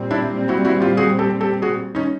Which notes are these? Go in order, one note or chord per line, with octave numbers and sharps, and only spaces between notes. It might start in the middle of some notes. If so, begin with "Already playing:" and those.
Already playing: A#2 G3 C4
D4 E4
E4 F#4
E4 F#4
F4 G4
F#4 G#4
G4 A4
G4 A4
F#4 G#4
C#4 D#4